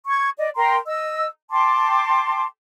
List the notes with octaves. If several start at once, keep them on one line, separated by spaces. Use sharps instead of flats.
C#6 G#6
D5 D#5
A#4 G5 A#5 C6
D#5 E6
G5 A5 C6 D6